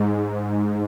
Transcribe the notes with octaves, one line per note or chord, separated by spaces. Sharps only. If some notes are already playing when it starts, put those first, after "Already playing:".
Already playing: G#2